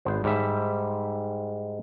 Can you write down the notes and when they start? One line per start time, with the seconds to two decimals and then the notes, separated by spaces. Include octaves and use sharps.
0.05 G#1 B3 C5
0.24 G#2 G3 E5